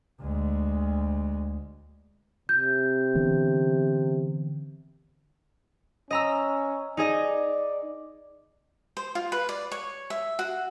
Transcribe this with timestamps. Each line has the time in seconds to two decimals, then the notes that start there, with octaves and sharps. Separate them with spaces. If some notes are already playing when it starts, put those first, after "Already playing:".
0.21 D2 G#3
2.49 C3 G6
3.15 D3 E3 B3
6.11 C#4 D#5 A#5 E6
6.97 D#4 G#4 D5 D#5
8.97 C5
9.15 F4
9.32 B4
9.49 D5
9.72 C#5
10.10 E5
10.39 F#4